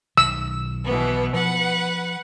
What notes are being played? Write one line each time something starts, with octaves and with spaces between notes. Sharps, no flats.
B1 D#3 E6
B2 E3 B3
F3 B4 F#5